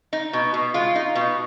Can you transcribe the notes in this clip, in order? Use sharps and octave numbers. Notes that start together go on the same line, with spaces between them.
D#4
B2
B2
G#3 F4
D#4
B2